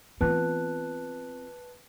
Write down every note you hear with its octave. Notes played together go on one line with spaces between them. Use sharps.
E3 A3 B3 C4 F4 B4 A5 F#6